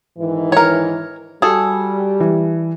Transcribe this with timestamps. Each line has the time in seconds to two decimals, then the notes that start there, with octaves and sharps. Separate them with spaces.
0.18 G#2 D#3 E3
0.52 A#4 C#5
1.42 G3 F#4 G#4 A4
2.20 E3